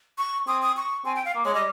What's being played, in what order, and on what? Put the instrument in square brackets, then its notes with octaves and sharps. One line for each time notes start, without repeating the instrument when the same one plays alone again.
[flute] C#6
[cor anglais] C4 [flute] D#6
[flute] D#6
C#6
[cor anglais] C4 [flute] G#5
[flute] G5
F5
[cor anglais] A#3
[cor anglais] G#3 [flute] C#5
[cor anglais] G3 [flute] D#5